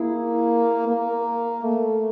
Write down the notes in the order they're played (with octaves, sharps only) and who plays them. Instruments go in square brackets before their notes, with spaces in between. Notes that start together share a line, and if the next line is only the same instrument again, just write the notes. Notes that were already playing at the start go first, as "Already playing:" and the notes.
Already playing: [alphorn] A#3 [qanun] E4 G#4
[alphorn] A#3
A3